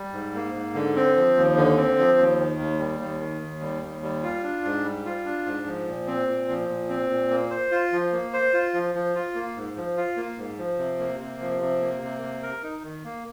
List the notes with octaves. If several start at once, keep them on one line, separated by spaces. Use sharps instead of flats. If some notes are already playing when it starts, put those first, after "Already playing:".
Already playing: G3
G#2
A#3
G#2
D3
C4
F3
D#2
D3
C4
F3
D#2
D#3
D#2
G3
D#2
D#3
D#2
G3
D#2
G3
F4
D4
G#2
G3
F4
D4
G#2
F3
A#2
C4
A#2
F3
A#2
C4
A#2
A#3
C5
F4
F3
A#3
C5
F4
F3
F3
F4
A#3
G#2
F3
F4
A#3
G#2
F3
C3
A#3
C3
F3
C3
A#3
C3
A#3
A#4
D#4
D#3
A#3